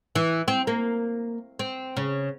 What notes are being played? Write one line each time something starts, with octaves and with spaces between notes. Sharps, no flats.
E3
C4
A#3
C4
C#3